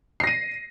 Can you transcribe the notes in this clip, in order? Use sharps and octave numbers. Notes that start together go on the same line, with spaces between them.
A#6 C7 D#7